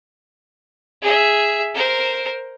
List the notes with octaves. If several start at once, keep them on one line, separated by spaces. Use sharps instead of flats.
G#4 E5
A#4 C5